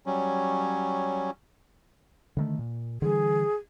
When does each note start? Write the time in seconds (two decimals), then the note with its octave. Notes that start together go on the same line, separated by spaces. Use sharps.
0.06 F#3 G3 C#4
2.37 D3 D#3 A3
2.59 A#2
3.02 D3 E3 G3 G#4